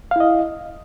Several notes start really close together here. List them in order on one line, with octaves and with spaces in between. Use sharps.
F5 E4 D#5